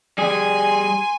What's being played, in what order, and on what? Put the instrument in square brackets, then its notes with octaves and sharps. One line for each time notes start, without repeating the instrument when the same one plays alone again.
[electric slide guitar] G3 G#4 [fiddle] G#5 C6